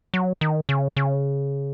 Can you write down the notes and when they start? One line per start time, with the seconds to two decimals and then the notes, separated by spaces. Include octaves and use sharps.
0.14 F#3
0.41 D#3
0.69 C#3
0.96 C#3